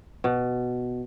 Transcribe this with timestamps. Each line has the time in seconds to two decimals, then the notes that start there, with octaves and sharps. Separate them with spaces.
0.24 B2